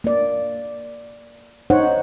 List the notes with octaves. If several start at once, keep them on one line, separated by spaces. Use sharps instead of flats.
A#3 D5
D#4 C5 C#5 F#5